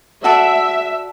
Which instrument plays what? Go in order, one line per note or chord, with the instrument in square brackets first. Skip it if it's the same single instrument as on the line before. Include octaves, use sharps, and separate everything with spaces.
[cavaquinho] F#4 A4 D5 [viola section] E5